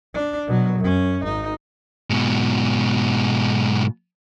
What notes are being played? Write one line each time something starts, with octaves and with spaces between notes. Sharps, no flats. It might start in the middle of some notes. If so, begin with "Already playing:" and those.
D4
B2 F#3
F#2 C#4
G#1 D#4
G#2 B2